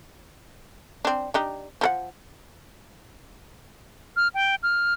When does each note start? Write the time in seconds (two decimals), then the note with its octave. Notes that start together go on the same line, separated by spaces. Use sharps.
1.05 C4 D4
1.34 D4 D#4 G4
1.81 F3 A4 F#5
4.16 F6
4.34 G5
4.63 F6